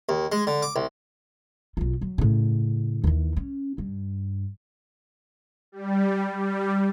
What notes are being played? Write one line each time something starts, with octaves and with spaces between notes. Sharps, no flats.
D#2
G#3
D3
D6
C2
B1 F4
F#3
A2 C#3
D#2 E3
C#4
G2
G3
G3